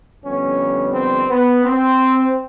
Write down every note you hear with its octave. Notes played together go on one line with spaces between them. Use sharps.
F2 D3 G3 B3 C#4
C4
B3
C4